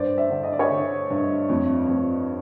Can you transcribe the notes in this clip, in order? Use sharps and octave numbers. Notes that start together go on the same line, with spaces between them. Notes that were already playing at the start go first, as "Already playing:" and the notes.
Already playing: G2 C5 D5
D5 E5
D3
D#5
D5
C#5 D#5
D3
G2
F2
F2